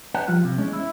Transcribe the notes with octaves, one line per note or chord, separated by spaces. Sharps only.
B4 F#5
F3 G3 F4
C3
E2 G#3 C#4
E4